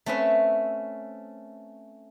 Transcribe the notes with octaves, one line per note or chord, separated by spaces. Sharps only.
A3 C4 C#4 B4 E5